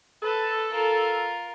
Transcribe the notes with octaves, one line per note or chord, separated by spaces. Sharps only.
A4 B4 A5
F4 A#4